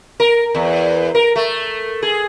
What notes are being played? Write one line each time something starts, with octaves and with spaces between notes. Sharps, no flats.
A#4
E2
A#4
A3
G#4